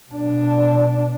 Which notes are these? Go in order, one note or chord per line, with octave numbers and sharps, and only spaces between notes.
B2 D4